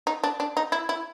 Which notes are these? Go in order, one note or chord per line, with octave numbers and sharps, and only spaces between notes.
D#4
D4
D4
D#4
E4
E4